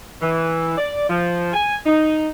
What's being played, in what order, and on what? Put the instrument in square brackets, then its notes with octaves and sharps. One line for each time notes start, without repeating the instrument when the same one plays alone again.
[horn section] E3
D5
F3
G#5
D#4